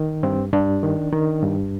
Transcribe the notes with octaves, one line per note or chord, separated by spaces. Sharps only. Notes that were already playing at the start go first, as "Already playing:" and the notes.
Already playing: D#3
G2 C4
G2 D4
D#3
D#3
G2